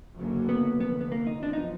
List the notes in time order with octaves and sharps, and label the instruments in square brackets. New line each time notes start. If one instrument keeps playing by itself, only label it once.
[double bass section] F#1 F#2 D3 F#3 A#3
[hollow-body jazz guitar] B3
[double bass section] F1 D#2 D3 [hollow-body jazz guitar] B3
[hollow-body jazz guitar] B3
A#3
D#4
[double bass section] F#2 F3 B3 [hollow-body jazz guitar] D4
[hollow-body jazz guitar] D#4